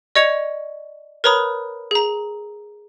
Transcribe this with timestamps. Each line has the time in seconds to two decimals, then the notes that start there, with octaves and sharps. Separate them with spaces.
0.15 D5 D#5 C#6 G#6 C#7 F7
1.24 A#4 B4 C#5 A#5 B5 D#6
1.91 G#4 A#5